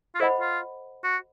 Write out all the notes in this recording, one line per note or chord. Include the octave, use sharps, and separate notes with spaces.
F4
E4 A4 C5 D#5 F#5 B5
F4
F#4